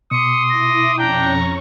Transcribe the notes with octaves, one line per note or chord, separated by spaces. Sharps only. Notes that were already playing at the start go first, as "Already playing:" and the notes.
B2 C6 D6 D#6 C#7
E4 A#6
F2 C#4 D4 G5 A#5 C#6